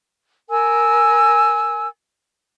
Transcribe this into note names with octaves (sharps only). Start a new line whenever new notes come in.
A#4 G#5 E6